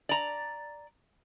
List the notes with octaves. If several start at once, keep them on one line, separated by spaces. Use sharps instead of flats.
D5 A#5